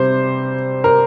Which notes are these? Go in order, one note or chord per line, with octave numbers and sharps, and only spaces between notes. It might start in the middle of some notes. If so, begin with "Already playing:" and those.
Already playing: C3 G3 C5
A#4